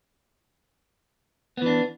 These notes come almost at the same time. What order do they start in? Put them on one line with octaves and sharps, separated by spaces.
B3 E3 D4